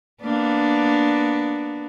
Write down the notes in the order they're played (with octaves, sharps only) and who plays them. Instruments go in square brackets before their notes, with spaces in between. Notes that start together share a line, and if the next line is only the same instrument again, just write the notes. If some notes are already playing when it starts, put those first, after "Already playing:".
[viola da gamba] A#3 B3 D4